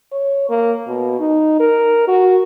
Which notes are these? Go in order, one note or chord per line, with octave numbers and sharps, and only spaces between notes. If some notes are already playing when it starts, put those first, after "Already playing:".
C#5
A#3
B2
D#4
A#4
F#4